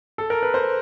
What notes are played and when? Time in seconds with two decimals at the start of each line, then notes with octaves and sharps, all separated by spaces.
0.18 A4
0.30 A#4
0.43 B4
0.54 C5